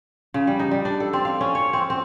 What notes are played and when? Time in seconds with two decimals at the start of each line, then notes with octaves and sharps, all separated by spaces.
0.34 C#3
0.47 G3
0.59 D#4
0.71 G3
0.85 D4
1.00 A4
1.13 C4
1.25 F5
1.41 C#4
1.55 C#5
1.73 C4
1.90 C4